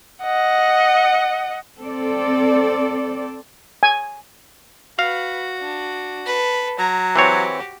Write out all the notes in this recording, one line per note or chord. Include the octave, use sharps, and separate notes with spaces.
D#5 F#5
C4 A4 D5
G#5
F#4 B4 F5
D4
A4 B4
F#3 A#5
E3 C4 F#4 G4 C#5